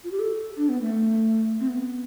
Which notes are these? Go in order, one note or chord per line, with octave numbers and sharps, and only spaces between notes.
F4
G4
A4
D4
B3
A3
C4
B3